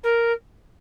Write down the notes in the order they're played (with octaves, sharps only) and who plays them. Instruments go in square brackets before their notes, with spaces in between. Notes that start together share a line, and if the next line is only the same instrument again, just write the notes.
[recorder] A#4